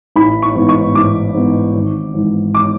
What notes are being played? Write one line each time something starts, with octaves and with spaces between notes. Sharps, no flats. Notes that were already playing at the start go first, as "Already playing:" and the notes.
A1 B5
C#6
G#2 E3 B3
C#6
A1 D6
G#2 E3 B3
G#1
G#2 E3 G#3
D6